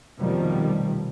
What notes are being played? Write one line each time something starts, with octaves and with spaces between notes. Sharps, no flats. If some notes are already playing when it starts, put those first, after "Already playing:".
F1 B2 D#3 F3 G3